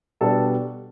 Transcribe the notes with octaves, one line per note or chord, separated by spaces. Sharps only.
B2 G3 B3 D4 A4